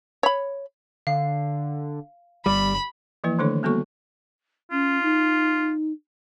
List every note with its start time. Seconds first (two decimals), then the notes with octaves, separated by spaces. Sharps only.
0.23 C#5 B5
1.07 D3 F5 C7
2.46 G1 G3 B5
3.24 E3 F3 A#3 E4 B4
3.39 D3 D#3 A3 D4 A4 C#5
3.63 G3 A#3 B3 F#4 A4 C#6
4.72 C#4 F4
5.02 D#4